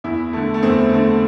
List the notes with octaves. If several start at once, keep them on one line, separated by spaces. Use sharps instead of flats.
E2 E4
D3 A3
A3
E2 C4
D3 A3